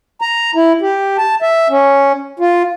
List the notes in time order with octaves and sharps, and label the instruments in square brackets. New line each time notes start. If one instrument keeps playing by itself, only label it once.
[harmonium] A#5
E4
G4
A5
E5
C#4
F4